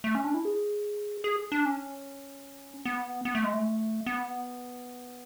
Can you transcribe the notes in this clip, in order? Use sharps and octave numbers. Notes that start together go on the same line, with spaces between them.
A3
C#4
D4
E4
G#4
G#4
D4
C#4
B3
B3
A3
G#3
A3
B3